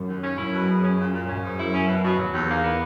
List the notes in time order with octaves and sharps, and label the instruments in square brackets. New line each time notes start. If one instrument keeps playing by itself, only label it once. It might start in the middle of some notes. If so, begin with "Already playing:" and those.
Already playing: [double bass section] F#2
[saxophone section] D#2
C#4
[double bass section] F#2 [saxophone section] E4
[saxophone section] B2
G#4
C#4
A#2
A#2
[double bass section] F#2 [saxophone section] C#4
[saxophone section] G#2
E4
C#4
B2
B2
[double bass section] E2 [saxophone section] F#3
[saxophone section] D#2
A#3
B3